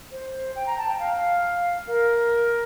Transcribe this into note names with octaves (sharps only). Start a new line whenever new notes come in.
C5
G5
A#5
A5
G5
F5
A#4